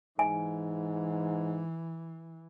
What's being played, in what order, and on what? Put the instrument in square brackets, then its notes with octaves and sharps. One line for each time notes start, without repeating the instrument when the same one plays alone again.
[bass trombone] G#2 [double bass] E3 [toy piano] G#5